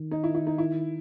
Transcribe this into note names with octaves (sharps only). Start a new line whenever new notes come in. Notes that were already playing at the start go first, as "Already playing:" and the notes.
Already playing: D#3
D#4
E4
E4
D#4
E4